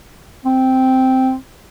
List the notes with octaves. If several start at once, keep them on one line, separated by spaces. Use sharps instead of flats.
C4